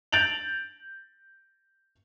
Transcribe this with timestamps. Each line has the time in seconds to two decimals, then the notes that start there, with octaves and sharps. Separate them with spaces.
0.12 G6 A6 D7 F7 F#7